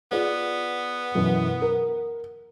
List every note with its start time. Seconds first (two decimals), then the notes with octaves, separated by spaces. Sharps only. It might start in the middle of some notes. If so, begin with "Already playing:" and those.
0.12 B3 F4 G#4 D5
1.15 F#2 B2 E3
1.62 A#4